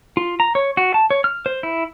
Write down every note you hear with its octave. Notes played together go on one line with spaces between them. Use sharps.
F4
A#5
C#5
F#4
A5
C#5
F6
C5
E4